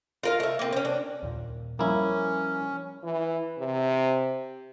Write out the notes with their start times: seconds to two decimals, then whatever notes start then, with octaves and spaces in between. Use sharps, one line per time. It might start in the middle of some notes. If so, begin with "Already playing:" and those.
0.23 F4 A#4 F5
0.40 A3 E5
0.59 A#3 C4
0.73 C4 C#4
0.85 D4
1.23 D#2 A#2
1.79 F3 G3 A#3 C#4 E4
3.04 E3
3.59 C3